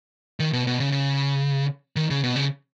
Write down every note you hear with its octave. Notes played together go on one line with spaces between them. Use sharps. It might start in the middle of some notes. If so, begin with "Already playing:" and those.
D#3
B2
B2
C#3
C#3
D#3
C#3
B2
C#3